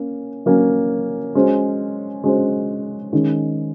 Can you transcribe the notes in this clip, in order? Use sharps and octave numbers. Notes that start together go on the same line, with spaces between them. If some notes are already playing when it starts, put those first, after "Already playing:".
Already playing: A#3 C#4
F#3 A#3 C#4
G#3 C#4 F#4 C5
G#3 C#4 F#4 C5
D#3 G#3 C#4